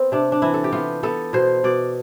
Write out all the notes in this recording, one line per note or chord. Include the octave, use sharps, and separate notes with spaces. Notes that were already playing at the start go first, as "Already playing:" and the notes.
Already playing: B3 C4
C3 D4
D4
E3 E4
A4
G4
B3 F4
B3 A4
B2 C5
B2 D5